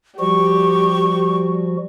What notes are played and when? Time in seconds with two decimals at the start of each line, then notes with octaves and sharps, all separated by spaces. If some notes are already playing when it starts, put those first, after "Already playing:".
0.20 F3 G3 F#4 G4 C#6